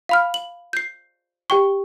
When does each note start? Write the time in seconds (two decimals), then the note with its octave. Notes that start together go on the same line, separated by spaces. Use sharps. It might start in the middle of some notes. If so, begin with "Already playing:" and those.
0.09 F5 B5 F6
0.34 F#7
0.73 G6 C7
1.50 G4 G5 C#6